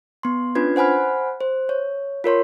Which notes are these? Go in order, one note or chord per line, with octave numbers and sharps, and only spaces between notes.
B3 C6
C#4 D4 F4 B4 G#6
C5 F#5 G#5 B5 F6
C5
C#5
F4 A#4 C#5 C6